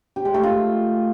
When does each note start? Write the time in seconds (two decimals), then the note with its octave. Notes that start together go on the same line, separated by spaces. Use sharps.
0.16 G4
0.25 G#3
0.34 A3
0.43 F4